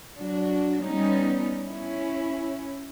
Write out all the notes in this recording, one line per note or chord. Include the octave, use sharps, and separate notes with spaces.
F#3 D4 F#4
G3 B3 C#4 D#4
C#4 E4